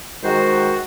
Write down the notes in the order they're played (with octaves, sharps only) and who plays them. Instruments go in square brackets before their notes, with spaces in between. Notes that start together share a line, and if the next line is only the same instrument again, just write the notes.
[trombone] D#3 [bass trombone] G#3 [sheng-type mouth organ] F#4 [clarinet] C5